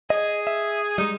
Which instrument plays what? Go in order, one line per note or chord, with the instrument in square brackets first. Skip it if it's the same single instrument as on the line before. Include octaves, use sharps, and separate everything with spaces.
[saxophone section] G#4 [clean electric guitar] D#5
[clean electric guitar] E5
[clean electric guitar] G3 G#3 [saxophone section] D#4